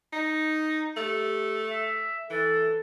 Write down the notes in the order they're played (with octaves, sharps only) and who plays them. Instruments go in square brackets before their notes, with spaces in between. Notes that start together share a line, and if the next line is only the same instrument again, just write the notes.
[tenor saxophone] D#4
[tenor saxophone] A3 [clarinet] G4
[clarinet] E5
[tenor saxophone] E3 [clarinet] A4